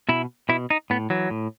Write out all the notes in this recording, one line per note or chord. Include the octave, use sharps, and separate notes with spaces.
B2 E4
B2 E4
D#4
A2 B3
E3 F#3
A2